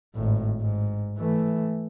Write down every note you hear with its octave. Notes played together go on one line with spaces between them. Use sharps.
G#1 A2
G#2
E3 A3